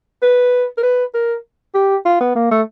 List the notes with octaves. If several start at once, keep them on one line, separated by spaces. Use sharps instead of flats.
B4
A#4
B4
A#4
G4
F4
B3
A#3
A3